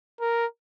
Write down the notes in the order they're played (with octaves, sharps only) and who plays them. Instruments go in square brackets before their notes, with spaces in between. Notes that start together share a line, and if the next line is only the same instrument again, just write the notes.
[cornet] A#4